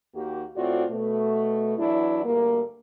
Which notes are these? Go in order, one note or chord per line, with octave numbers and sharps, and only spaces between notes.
D#2 A#3 F#4 G4
A2 C4 F4 F#4 D5
B2 A3
E2 F#3 D4 E4
D2 G2 A#3